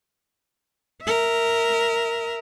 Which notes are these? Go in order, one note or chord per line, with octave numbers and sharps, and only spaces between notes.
A#4 E5